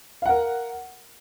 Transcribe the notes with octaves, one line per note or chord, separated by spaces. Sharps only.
A#4 F5 F#5